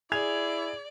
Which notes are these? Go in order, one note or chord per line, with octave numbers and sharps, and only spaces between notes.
E4 G#4 D5 G#6 F7